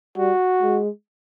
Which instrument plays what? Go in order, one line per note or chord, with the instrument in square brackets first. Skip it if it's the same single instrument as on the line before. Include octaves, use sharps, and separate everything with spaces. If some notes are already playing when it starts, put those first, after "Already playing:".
[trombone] G3 [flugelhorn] F#4
[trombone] G#3